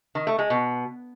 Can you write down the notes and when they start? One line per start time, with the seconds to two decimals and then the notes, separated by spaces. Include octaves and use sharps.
0.15 D#3
0.27 A3
0.39 G#3
0.50 B2